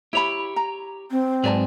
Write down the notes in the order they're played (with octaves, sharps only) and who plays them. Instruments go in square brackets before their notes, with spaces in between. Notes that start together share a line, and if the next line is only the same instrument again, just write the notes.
[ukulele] E4 B5 [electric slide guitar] G4 C#5
[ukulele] A#5
[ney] C4
[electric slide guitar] G#2 F#3 G#4 [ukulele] B4 D5 A5